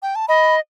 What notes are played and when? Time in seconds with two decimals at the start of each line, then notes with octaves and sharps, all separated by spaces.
0.03 G5
0.15 A5
0.28 D#5 B5